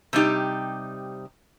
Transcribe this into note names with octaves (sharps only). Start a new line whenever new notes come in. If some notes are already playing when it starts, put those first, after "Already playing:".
C3 G3 D#4 G4